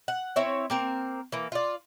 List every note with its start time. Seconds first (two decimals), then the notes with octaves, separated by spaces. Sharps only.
0.08 F#5
0.36 C4 E4 C#5
0.70 A#3 C4 A#4
1.32 E3 A#3
1.52 F4 D5